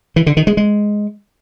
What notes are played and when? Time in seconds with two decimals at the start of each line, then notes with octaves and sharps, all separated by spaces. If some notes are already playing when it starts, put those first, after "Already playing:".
0.16 E3
0.26 D3
0.37 D#3
0.47 G#3
0.57 G#3